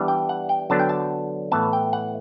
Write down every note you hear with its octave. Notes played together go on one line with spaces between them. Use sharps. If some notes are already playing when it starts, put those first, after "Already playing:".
Already playing: E3 G3 B3 D4
G5
F#5
G5
D3 F#3 B3 D4 A5
G5
A5
A2 E3 B3 A5
G5
F#5